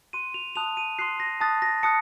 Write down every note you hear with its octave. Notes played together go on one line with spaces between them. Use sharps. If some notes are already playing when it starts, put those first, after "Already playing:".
C6 F#6 D#7
F7
A5 C6 D#6 F#6 F7
D#7
C6 D#6 F#6 C7
A#6
A5 D#6 F#6 A6
A#6
A5 D#6 F#6 C#7